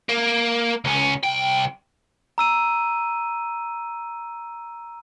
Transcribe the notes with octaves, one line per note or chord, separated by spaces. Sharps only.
A#3
C#2 C#4
C2 G5
A#5 E6 D#7